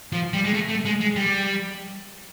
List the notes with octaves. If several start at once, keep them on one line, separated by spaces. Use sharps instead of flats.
F3
G3
G#3
A3
A3
G#3
G#3
G3